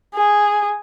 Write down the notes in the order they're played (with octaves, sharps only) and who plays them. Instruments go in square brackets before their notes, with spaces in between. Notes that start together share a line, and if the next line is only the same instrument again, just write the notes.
[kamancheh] G#4